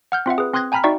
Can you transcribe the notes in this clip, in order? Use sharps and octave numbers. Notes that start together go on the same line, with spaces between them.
F#5 F6 G6
C4 F4 E5 F#5
G#4 B4
C4 C6 D#6 F#6 G#6 A#6
G5 G#5 A#5 B5 F6 B6
D#4 F#4 D5 E5 G5 C#6